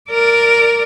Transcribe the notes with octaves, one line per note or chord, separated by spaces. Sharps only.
A#4 D5